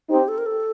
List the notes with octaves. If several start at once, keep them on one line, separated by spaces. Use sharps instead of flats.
C4 D#4 G4
A4
A#4
A4